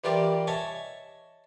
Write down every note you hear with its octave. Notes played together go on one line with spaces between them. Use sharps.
E3 G3 F4 G4 A#4 D5
C#5 D#5 E5 G#5 A5 C#6